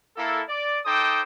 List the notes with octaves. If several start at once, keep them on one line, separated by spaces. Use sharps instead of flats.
A#3 E4 A4
D5
D#4 A4 C5 G5 D6 D#6